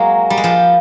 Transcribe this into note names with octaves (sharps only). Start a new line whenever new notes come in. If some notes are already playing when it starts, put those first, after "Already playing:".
Already playing: F#3 G#3 A#3
G3
G#3
F3 G3